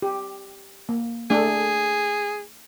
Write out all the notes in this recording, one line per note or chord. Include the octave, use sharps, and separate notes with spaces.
G4
A#3
A3 D4 G#4 A4